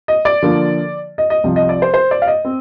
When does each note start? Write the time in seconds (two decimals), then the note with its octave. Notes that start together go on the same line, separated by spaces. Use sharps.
0.08 D#5
0.25 D5
0.42 D3 F3 A#3 F4
1.18 D#5
1.30 D#5
1.44 C2 C3 F3
1.56 D#5
1.69 D5
1.82 C5
1.94 C5
2.11 D5
2.22 F5
2.27 D#5
2.45 C4